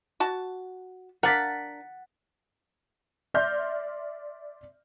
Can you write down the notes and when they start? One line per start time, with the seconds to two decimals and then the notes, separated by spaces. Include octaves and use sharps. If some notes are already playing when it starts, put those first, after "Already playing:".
0.20 F#4 A5
1.23 D4 A#4 F#5 A6 B6
3.34 D5 E5 C6 F6 G6 A#6